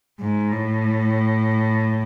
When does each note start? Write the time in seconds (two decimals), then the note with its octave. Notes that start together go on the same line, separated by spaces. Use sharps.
0.20 G#2
0.52 A2